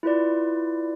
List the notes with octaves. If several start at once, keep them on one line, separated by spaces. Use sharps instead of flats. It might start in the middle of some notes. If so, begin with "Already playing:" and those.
E4 F4 B4 D5